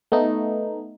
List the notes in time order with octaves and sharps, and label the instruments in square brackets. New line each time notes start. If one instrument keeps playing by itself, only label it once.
[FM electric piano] A3 B3 D#4